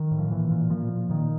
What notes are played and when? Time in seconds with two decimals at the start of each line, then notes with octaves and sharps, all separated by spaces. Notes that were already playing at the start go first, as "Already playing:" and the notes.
Already playing: D#3
0.12 A2
0.19 F3
0.30 A#2 E3
0.51 A#2
0.70 A#2 F3
0.91 A#2
1.10 A#2 D#3